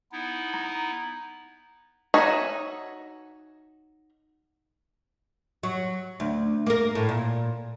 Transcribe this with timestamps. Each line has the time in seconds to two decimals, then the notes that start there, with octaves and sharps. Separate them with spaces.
0.12 B3 D#4 E4
0.54 A#5
2.14 D#4 F#4 C#5 E5 G#5
5.63 F#3
6.20 D2
6.66 A#3 A#4
6.95 A2
7.09 A#2